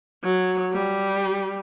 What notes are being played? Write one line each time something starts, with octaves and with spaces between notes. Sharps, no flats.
F#3
G3